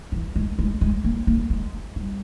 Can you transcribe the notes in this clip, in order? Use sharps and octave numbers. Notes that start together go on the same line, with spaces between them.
E3
G#3
G#3
G#3
A#3
A#3
G#3
G3